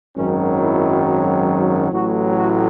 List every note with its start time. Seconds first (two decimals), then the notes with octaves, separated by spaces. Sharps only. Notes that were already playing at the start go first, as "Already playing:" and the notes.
0.17 G#1 F#2 D#3 F#3 C#4
0.61 E4
1.92 A1 A2 F#3 F#4
2.36 F#4